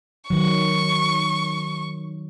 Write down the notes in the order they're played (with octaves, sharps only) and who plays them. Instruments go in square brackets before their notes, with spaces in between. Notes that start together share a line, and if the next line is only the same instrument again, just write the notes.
[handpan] D#3 F#3 [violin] C#6